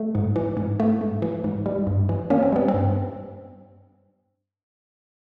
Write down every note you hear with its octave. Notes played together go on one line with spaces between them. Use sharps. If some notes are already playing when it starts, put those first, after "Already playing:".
Already playing: A3
G#2
E3
G#2
A3
G#2
E3
G#2
G3
G2
E3
A#3 C#4
C4
G3 B3
C4
G2